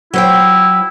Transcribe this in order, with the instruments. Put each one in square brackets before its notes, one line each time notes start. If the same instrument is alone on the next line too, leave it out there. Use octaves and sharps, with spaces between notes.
[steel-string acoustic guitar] F#3 C5 G5 [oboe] E4